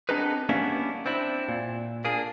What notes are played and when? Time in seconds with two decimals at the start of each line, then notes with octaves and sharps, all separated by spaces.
0.09 B3 C4 D4 D#4 G#4 B4
0.49 G3 A#3 B3 C#4 D4 E4
1.06 C4 D4 E4
1.49 A#2
2.05 A#3 D4 G#4